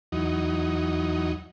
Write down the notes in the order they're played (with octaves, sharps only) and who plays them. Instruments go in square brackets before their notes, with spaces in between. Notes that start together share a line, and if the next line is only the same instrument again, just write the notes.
[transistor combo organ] E2 F#3 D#4